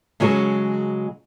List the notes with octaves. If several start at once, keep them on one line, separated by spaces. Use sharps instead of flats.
C#3 F#3 G#3 A4 C#5